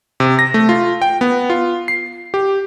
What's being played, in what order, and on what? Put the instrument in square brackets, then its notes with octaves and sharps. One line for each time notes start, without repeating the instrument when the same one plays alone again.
[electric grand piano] C3
A#6
A3
F4
G5
B3
F4
C7
G4